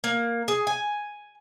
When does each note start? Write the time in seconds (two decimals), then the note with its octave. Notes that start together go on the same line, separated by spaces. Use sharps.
0.04 A#3
0.48 G#4
0.67 G#5